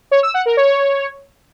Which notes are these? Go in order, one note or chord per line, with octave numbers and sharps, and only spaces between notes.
C#5
E6
F#5
A#4
C#5